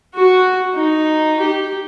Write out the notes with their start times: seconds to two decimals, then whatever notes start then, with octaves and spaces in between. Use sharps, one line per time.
0.15 F#4
0.74 D#4
1.40 G4